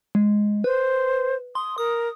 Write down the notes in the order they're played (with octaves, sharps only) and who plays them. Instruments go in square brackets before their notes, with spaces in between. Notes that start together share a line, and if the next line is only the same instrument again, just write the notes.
[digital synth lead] G#3
[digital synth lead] B4 [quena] C5
[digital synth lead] C6 [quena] D#6
[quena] A#4 [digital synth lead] D#6